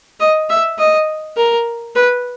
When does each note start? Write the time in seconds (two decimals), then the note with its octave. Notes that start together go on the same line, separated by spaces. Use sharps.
0.20 D#5
0.50 E5
0.78 D#5
1.37 A#4
1.96 B4